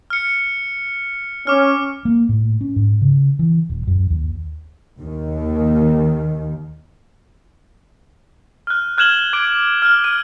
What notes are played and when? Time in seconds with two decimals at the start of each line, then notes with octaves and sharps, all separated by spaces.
0.10 F6 C#7
1.47 C#4 D6 F6
2.05 A#3
2.29 A2
2.61 C#4
2.76 G#2
3.01 C#3
3.39 E3
3.70 D#1
3.87 F#2
4.10 D#2
5.00 D#2 D#3
8.67 F6 F#6
8.98 F6 F#6 G#6 E7 F#7 G7
9.33 D6 G#6 D7
9.82 F6 F#6
10.04 F6 D#7